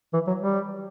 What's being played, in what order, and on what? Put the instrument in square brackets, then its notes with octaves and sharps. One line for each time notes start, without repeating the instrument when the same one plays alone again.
[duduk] E3
F#3
G3